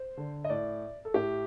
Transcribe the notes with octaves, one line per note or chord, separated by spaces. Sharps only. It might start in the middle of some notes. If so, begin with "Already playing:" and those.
Already playing: C5
D3
D#5
A2 D5
A4
A2 G4